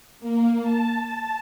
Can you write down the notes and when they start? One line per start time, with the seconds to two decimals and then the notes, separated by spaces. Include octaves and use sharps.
0.20 A#3
0.62 A5